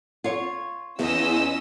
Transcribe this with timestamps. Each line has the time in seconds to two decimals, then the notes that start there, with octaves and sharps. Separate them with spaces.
0.24 F4 C#5
0.99 E2 C#4 F4 D#5 E6